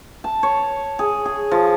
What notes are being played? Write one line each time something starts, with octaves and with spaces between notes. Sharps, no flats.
A5
C#5
G#4
G#4
F3